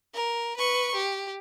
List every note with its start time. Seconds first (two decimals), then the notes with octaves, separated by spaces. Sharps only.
0.15 A#4
0.57 B4 C#6
0.95 G4